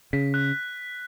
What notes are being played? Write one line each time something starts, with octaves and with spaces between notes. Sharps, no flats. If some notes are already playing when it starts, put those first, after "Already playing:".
C#3 B6
F#6